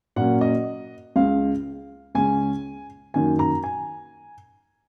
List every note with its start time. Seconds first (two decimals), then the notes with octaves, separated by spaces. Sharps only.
0.16 A#2 F#3 A#3 C#4 F#5
0.41 D#5
1.16 C#2 C#3 G#3 F5
2.15 C#2 C#3 G#3 C#4 G#5
3.14 F#2 D#3 A#3 G#5
3.39 A#5
3.64 G#5